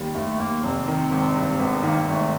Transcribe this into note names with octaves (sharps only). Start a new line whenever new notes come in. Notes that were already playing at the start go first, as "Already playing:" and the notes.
Already playing: D#2 D#3 G3
D#2 A3
D#2 A#3
F1 C4
D#3
G#1
G2
G#1 B3
D#3 A#3
G#1 A3